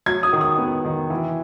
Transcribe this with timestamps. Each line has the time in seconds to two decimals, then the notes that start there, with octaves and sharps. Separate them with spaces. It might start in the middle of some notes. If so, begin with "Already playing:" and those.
0.06 F#3 G#6
0.23 D#6
0.33 D#3
0.41 D#6
0.58 B3
0.85 D#3
1.10 E3